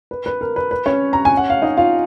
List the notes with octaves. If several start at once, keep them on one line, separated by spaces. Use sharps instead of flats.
B4
B4
A#4
B4
B4
C#4 C#5
A#5
G#5
F#5
F5
D#4 D#5
F4 F5